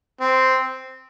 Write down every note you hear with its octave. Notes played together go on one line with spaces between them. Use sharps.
C4